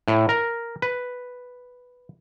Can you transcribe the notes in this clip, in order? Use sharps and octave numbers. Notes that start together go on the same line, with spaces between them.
A2
A#4
B4